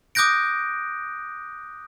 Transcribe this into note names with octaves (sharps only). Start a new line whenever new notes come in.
D6 D#6 F#6 G6 A#6 D7